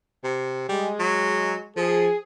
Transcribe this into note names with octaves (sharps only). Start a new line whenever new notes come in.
C3
G3 G#3
F#3
F3 G#4